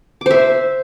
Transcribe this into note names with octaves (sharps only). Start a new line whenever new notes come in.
C5 E5 D6